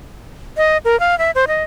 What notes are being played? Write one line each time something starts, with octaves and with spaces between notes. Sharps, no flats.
D#5
A#4
F5
E5
C5
D#5